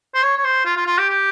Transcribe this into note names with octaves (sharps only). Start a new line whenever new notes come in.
C5
C#5
C#5
C5
F4
F4
F4
G4
G4